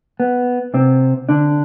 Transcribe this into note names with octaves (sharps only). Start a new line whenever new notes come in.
B3
C3 C4
D3 D4